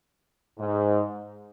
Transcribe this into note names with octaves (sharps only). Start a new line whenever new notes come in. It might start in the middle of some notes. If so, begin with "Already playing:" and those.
G#2